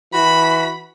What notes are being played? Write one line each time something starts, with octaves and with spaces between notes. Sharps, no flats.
E3 F#4 B5